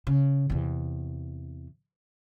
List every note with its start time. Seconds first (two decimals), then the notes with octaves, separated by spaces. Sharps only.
0.07 C#3
0.50 E2 C3